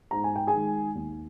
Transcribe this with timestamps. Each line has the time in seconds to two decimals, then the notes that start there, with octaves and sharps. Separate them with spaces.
0.11 G#2 A#5
0.24 G#5
0.36 G5
0.47 G#4 G#5
0.53 D#3 G#3
0.95 D#2